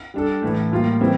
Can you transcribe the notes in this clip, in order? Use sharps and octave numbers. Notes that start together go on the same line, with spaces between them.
G3 D4 A4
A2 E3 A3
A2 G3 A#3 F4
E3 G3 C4